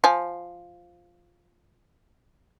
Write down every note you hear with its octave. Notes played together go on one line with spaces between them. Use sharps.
F3 G#5